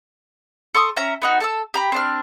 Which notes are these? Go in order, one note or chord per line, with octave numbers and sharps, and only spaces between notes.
A4 C6 C#6 D#6
C#4 E5 A#5
B3 D#4 F#4
A4 A5 E6
G4 A#5 B5
C4 D4 F6